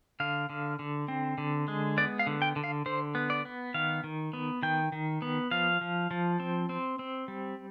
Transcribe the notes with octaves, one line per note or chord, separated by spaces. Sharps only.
D3 F5
D3
D3
C4
D3
G#3
B3 D5
F5
D3
G5
D3
F5
D3 C5
B3
D5
B3
D#3 F5
D#3
B3
D#3 G5
D#3
B3
F3 F5
F3
F3
C4
C4
C4
G3